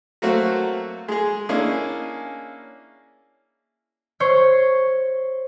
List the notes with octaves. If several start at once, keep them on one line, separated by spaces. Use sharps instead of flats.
F#3 A3 A#3 C4 F#4
G#3 G#4
A#3 C#4 D4 E4 G#4 D#5
C5 C#5